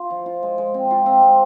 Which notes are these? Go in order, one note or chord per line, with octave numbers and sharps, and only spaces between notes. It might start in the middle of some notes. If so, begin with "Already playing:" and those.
Already playing: F4
F3
F4
G#3
G#3
C4
F4
C4
G#3